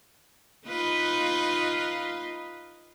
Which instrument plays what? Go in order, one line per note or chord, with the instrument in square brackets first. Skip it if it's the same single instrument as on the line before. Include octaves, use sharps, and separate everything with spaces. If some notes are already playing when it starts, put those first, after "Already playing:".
[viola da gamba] D#4 F4 B4